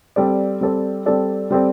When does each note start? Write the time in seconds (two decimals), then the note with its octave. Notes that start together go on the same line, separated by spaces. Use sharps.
0.16 G3 C4 A4 D5
0.61 G3 C4 A4 D5
1.06 G3 C4 A4 D5
1.51 G3 C4 A4 D5